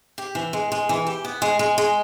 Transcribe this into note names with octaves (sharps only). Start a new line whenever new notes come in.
G4
E3
G#3
G#3
E3
G4
B3
G#3
G#3
G#3